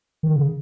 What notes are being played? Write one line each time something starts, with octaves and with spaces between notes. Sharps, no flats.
D#3
C#3